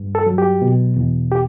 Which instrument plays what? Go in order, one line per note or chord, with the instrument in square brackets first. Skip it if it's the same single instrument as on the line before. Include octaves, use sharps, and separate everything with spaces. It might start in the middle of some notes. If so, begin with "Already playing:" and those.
Already playing: [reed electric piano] G2
A4
F#3
G4
B2
E2
G4